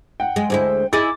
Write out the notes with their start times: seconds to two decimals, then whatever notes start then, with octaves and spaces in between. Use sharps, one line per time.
0.20 F#5 G5
0.36 G#3
0.50 D2 G#3 E4 C5
0.93 E4 G#4 D#5 D6 A6